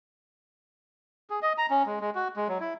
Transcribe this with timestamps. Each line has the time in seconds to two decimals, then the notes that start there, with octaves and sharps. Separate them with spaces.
1.30 G#4
1.42 D#5
1.58 A#5
1.70 C#4
1.86 G#3
2.01 G#3
2.15 F#4
2.36 G#3
2.49 F#3
2.60 E4